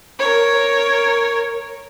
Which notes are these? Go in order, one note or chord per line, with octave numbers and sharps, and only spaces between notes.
A#4 C#5